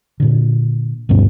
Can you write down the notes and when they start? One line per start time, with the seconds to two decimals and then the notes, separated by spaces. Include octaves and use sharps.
0.20 A#2 D3
1.09 D2 G2 B2 C#4